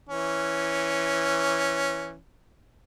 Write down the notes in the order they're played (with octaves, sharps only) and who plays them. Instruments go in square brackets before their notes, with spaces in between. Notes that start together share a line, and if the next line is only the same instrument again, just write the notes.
[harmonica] E3 C#4